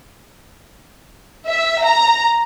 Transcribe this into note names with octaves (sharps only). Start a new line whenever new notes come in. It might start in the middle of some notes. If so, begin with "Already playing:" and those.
E5
A#5